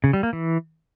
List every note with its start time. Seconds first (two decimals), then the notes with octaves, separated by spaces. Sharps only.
0.04 C#3
0.13 G3
0.23 A#3
0.33 E3